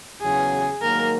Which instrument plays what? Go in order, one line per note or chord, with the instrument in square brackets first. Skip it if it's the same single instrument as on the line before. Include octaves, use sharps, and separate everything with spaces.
[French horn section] E2 C#3 F#3 [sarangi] G#4
[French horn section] G#2 D#3 F#3 A#3 [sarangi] A#4